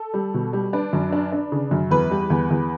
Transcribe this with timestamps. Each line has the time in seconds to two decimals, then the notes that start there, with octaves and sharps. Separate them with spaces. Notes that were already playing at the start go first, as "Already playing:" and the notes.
Already playing: A4
0.14 G3
0.34 B2
0.53 G3
0.73 D4 B4
0.93 F#2
1.12 D4
1.32 D4
1.52 C#3
1.71 F#2
1.90 E2 B4
2.11 G3
2.30 E2
2.50 E2